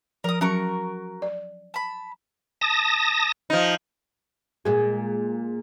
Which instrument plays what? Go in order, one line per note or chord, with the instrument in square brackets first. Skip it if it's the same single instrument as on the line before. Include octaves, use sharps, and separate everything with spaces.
[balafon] F3 [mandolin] A#4 D#6
[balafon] F#3 C#4 [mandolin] F#4 A#4 C#6
[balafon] D5
[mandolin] A5 B5
[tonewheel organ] A5 D#6 A#6
[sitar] F3 D#4
[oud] A#2 G#3